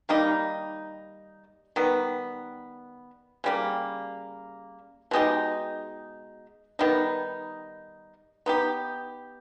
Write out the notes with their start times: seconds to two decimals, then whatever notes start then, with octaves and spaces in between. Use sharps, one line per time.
0.09 D#3 G3 A#3 D#4
1.76 D#3 G3 B3
3.44 C#3 G3 A#3
5.11 B2 G#3 D#4 G4
6.79 D#3 G3 B3 D#4
8.46 B3 D#4 G4